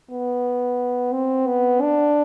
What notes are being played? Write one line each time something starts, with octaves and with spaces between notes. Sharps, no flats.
B3
C4
B3
D4